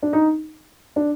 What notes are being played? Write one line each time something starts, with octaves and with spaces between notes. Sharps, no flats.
D4
D#4
D4